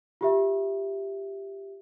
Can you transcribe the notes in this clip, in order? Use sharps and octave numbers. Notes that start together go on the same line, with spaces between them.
F4 G4 E5